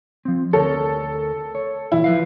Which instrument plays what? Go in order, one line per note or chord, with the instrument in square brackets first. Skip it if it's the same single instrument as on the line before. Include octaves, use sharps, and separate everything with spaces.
[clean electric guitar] F3 C4
[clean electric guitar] D2 A#4 C#5 [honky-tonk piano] A4
[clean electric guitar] C#5
[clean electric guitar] A#2 E3 [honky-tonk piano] E4
[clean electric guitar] F3 B4 F5